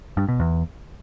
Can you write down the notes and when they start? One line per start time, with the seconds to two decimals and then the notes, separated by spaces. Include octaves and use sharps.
0.17 G2
0.28 B2
0.40 E2